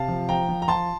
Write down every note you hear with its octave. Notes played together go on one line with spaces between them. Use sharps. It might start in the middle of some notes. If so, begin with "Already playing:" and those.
Already playing: C3 F5 A5
F3
F3 G5 A#5
F3
A#5
F3 A5 C6